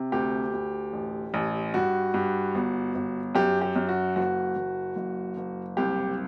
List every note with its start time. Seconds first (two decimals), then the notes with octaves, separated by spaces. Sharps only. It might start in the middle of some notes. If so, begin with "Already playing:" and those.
Already playing: C3
0.12 D2 G4
0.53 D2
0.93 A1
1.34 A1
1.74 G2 F#4
2.14 G2
2.55 G1
2.95 G1
3.35 F#2 G4
3.62 G4
3.76 F#2
3.89 F#4
4.16 F#1 F#4
4.56 F#1
4.96 F#1
5.37 F#1
5.77 C2 G4